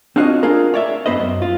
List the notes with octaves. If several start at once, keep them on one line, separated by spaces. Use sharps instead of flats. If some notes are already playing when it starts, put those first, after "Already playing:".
C4 D4 F4 F#4 C#5 D#5
D4 F4 G#4 A#4
C#5 D5 E5
G2 B3 B4 C5 D#5
F#2
F4